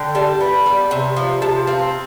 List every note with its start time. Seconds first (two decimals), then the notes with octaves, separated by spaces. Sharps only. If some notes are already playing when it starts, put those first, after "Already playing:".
Already playing: D3 G5
0.15 G3 A5
0.40 B3 B5
0.66 G3
0.91 C3
1.16 F3
1.42 C3 A5
1.67 C4 F5